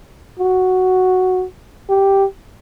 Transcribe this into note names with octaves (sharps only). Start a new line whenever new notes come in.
F#4
G4